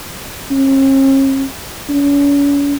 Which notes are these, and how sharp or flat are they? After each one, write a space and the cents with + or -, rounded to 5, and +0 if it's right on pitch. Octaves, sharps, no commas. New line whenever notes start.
C#4 -45
C#4 +40